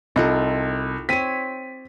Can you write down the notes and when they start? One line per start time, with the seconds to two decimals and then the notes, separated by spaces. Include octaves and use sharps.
0.16 C2 D#4 F4 A4
1.09 C4 C#5 B6 D#7